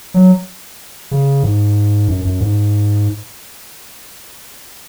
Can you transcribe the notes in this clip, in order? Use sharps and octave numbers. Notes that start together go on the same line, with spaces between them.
F#3
C#3
G#2
F#2
F#2
G#2